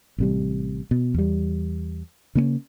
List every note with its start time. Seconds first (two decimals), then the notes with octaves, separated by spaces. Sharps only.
0.18 A1 C3 G3
0.91 B2
1.14 E2 G3
2.35 C#3 A#3 C4 C#4